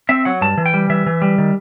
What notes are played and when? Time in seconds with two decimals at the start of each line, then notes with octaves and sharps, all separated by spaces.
0.09 C4 E5
0.25 F#3 F#5
0.41 G2 A5
0.58 E3
0.66 G5
0.74 G3
0.90 E3 E5
1.06 E3
1.22 G3
1.38 D#3